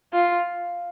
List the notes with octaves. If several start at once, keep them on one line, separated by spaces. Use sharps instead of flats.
F4